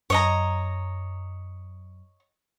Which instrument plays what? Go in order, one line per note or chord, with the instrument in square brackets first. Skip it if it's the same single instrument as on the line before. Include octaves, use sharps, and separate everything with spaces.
[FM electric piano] F#2 [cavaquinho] C#5 D#5 A#5